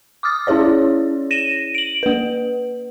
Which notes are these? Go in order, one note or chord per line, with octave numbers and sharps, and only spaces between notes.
D6 D#6 F6 A6
C#4 E4 G#4 C#5 D5
A#6 D#7 E7
D7 F#7
A#3 B4